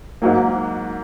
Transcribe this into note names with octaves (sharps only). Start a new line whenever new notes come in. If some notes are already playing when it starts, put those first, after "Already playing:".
G#2 F#3 A#3